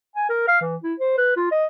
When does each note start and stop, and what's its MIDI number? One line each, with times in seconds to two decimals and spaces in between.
0.16 0.26 80
0.29 0.44 70
0.48 0.57 77
0.61 0.76 52
0.83 0.94 64
1.00 1.13 72
1.18 1.35 71
1.37 1.51 65
1.51 1.66 75